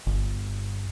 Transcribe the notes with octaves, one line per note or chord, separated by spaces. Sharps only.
G1